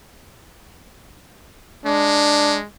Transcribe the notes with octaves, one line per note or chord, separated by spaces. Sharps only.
G#3 D4